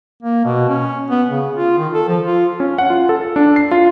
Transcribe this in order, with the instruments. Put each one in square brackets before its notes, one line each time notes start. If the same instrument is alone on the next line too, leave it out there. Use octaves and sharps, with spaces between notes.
[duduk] A#3
B2
C#4
B3
C#3
F4
D#3
A4
F3
F4
[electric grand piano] C#4
F#5
F4
A4
D4
C7
F4